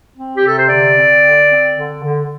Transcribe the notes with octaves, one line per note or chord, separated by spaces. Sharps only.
C4
G4
C3
A4
C5
D3 D5
C4
D3
C4
D3
D3